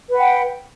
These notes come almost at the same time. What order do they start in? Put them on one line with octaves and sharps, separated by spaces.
B4 F#5 G5